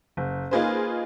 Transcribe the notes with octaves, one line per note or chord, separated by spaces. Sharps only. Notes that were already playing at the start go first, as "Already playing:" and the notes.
F#1
A#3 D#4 F4 G#4 B4 C5